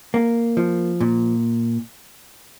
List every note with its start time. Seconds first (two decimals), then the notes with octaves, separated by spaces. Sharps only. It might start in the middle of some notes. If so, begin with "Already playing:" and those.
0.14 A#3
0.57 F3
1.00 A#2